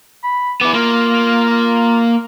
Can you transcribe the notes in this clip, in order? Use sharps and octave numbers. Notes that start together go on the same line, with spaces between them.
B5
B3 E4 D6
A#3 F4
F4